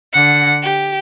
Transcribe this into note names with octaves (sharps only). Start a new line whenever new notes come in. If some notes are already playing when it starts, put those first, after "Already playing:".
D3 F#5
G4